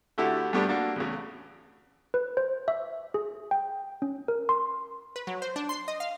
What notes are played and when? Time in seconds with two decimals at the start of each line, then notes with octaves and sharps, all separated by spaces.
0.18 D3 A3 E4 F#4 G4 A4
0.53 G2 G3 A3 B3 D4 G4
0.69 A#3 D4 F#4 A4
0.96 E2 A2 C#3
2.14 B4
2.37 C5
2.68 E5
3.14 G#4
3.51 G5
4.02 C#4
4.28 A#4
4.49 C6
5.16 B4
5.27 F#3
5.42 C5
5.56 D4
5.69 C6
5.88 D#5
6.00 F5